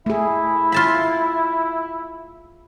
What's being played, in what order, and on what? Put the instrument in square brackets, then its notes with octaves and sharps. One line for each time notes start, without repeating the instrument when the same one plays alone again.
[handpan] A3 G#4 [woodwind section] E4
[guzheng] F4 A5 B5